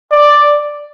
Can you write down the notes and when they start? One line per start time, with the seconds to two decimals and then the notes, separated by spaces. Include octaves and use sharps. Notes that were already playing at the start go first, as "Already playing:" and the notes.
0.12 D5